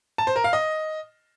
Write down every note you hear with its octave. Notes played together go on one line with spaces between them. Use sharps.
A5
C5
A#4
F5
D#5